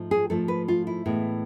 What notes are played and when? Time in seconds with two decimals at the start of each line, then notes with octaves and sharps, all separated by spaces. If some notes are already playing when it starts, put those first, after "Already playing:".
Already playing: G#2 F3 A3
0.11 G#4
0.30 G#2 F3 A3 A4
0.48 B4
0.68 F4
0.87 E4
1.06 A2 E3 G#3 B3